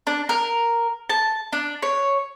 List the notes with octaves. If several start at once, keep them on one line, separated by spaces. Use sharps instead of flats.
D4
A#4
A5
D4
C#5